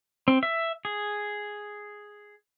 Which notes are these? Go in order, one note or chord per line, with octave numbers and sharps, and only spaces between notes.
C4
E5
G#4